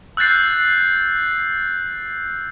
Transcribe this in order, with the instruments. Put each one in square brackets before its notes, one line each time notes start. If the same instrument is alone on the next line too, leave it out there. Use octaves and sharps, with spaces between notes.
[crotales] E6 F#6 G6 A6 C7